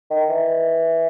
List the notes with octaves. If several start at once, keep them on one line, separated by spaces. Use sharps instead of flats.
D#3
E3